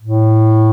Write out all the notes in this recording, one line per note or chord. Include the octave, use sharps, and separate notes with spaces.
A2